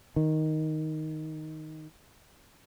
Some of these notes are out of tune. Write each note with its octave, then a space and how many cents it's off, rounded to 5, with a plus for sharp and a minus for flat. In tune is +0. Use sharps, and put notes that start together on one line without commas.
D#3 +5